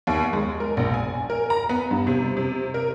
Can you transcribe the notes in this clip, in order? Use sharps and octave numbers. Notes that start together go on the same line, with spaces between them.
D#2
G#3
A#4
A#1
G#5
A#4
A#5
B3
G2
C3
C3
A#4